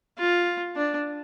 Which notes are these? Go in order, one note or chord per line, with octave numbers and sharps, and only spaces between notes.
F4
D4